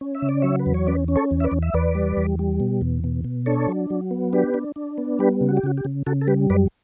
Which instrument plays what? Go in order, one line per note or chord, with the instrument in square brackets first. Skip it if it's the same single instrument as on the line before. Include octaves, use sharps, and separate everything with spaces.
[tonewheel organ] C#4
E5
C#3
D5
F#3 C#5 E5
B4
E2
C#5
C#4 B4 D5
C#4
A4 C#5
E2
E5
B4 D5
E2
E5
E2 B4 D5
G3
E2
G3
B2
E2
B2
B2
D4 A4 C#5
F#3
F#3
B3
D4 G4 B4
D4
D4
B3
G3 G4 B4
C#3
F#4
G4
C#3 F#4
G4
C#3
C#3 F#4 A4
A4
G3 G4 B4
F#2 B4 D5